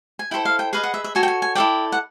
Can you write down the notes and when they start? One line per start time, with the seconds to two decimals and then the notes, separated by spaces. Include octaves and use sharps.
0.19 G#5
0.31 E4 A4 C5 G5
0.45 F5
0.59 G5
0.73 G#4 B4 D#5 F5
0.83 F#5
0.94 E5
1.04 E5
1.15 F#4 A4 C#5 G#5
1.23 G5
1.28 G#5
1.42 G#5
1.55 E4 A4 D5 G5
1.92 F#5